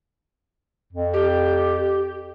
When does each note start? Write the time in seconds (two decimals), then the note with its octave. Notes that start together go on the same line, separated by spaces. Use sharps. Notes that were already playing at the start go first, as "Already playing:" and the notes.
0.93 F2
1.13 G4